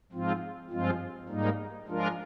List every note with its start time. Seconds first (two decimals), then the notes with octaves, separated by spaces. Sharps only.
0.12 G#2 F3 C4 F4
0.70 G2 F3 G#3 C4 F4
1.29 G#2 G3 A#3 D#4
1.87 F3 G#3 D4 F4 A#4